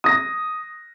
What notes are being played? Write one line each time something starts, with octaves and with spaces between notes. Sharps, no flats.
D#6 A#6